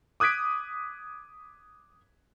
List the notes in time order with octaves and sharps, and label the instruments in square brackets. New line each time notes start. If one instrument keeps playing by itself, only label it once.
[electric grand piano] D6 D#6 F#6 G#6 B6 D7